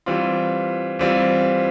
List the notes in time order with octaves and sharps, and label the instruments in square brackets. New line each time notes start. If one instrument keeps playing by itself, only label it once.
[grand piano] E3 G3 C4 F4
E3 G3 C4 F4